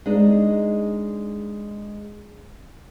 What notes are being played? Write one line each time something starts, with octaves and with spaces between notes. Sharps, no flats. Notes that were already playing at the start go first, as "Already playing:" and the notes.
G#3 D4 D#4